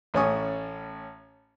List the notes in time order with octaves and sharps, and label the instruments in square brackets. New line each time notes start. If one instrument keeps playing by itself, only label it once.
[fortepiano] A1 A2 C#4 G#5 C#6 D#6